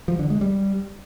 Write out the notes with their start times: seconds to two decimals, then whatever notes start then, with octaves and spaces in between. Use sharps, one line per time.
0.08 F3
0.19 D3
0.30 G#3
0.41 G3